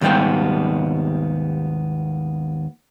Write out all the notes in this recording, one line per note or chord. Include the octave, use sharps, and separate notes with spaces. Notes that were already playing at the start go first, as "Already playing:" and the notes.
D#2 G#2 G3 B3 G5